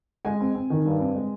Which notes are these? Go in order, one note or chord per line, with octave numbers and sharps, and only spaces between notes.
G#3 G#5
C4
C4
D#3
G2
C4
G#3